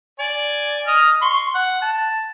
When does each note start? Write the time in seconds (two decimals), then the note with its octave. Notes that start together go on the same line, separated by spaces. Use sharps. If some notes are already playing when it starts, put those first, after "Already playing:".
0.20 D5 G#5
0.87 D#5 D#6 F6
1.22 C6 C#6
1.55 F#5
1.82 A5